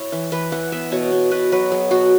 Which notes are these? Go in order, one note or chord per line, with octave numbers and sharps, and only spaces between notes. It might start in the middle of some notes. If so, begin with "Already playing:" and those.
Already playing: E4 C#5
E3
E3 B4
E3 F#5
B3 E5
B2 C#5
B2
B2 B4
F#3 B4
F#3 G#4
B2 F#4